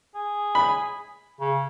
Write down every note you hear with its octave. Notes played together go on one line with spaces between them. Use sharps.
G#4
B5
C#3